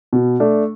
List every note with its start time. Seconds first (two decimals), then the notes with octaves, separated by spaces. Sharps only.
0.13 B2
0.40 A3 D4